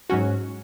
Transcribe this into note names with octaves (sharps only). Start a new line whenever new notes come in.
G#2 F#3 C#4 F#4